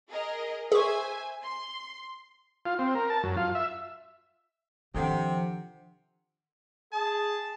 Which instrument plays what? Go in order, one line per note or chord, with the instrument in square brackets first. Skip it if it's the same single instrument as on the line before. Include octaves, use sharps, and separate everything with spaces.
[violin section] G#4 A#4 D#5
[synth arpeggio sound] G#4 C#6 [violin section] C5 E5 G#5
[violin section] C6
[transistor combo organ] F4
C4
A#4
A5
F#2
F4
E5
[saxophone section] C3 [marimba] D#3 A4 G5 [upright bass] F3 [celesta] D4 F#5
[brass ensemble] G#4 [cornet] A5